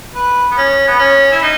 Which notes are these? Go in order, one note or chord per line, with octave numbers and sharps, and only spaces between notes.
B4
B3
C#4
B3
C#4
E4
D#4